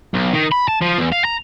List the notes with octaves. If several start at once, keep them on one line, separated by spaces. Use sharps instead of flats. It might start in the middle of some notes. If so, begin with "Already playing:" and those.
B1
D#3
B5
A5
F3
E2
F5
A#5